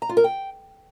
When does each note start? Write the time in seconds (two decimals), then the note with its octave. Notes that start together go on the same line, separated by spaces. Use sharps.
0.02 A#5
0.09 F4
0.17 A#4
0.24 G5